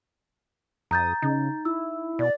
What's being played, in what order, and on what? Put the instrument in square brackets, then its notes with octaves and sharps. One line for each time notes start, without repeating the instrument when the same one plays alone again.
[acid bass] F2 [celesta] A#5 G6 A6 [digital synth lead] D#6
[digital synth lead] C#3 [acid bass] D#4
[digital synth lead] E4 [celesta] E6
[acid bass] B2 [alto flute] D5